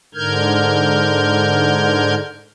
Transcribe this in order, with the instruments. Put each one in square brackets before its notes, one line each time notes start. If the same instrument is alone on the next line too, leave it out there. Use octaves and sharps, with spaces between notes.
[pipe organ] G#2 D3 A#4 F6 G6 G#6